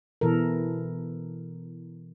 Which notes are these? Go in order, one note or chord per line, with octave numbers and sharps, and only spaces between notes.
B2 E3 A4 A#4